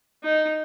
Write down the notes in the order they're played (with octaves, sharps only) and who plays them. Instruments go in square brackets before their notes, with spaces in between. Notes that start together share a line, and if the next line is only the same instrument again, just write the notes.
[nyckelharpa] D#4